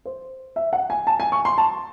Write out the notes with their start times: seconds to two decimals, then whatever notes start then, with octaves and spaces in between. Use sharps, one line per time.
0.05 C5
0.56 E5
0.73 F#5
0.90 G#5
1.07 A5
1.20 G#5
1.32 C#6
1.45 C6
1.58 A5